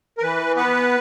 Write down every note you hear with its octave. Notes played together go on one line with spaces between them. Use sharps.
A#4
E3 B4
B3 B4